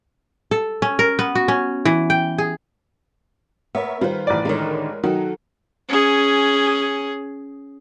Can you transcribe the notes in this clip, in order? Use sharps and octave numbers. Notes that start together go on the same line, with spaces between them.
A4
C#4
A#4
B3
F#4
C#4
E3
G5
G#4
B3 A#4 C#5 E5
D#3 G3 F4 B4 C5
A1 D5
D3 D#3 G#3 A#4 C#5
D#3 F#3 F#4 A4
C#4 G#4